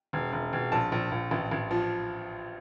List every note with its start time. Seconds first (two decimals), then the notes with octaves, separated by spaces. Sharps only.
0.13 E1
0.33 E1
0.53 E1
0.72 A#1 A5
0.92 A#1
1.12 A#1
1.31 A1
1.51 A1
1.71 F3